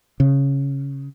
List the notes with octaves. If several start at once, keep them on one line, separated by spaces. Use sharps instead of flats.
C#3